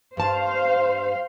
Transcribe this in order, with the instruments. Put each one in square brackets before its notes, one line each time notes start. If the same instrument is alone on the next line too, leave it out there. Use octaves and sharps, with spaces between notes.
[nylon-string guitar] G2 A5 [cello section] C5 F5